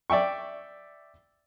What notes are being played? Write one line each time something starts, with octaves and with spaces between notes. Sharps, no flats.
D5 E5 G5 C#6